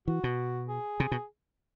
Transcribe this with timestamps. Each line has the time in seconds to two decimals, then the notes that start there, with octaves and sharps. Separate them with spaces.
0.08 E3 F#4
0.24 B2
0.69 G#4
1.00 C3
1.12 B2